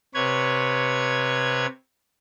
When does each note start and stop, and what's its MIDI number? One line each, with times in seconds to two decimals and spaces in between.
0.14 1.66 48
0.14 1.66 71
0.14 1.66 73
0.14 1.66 92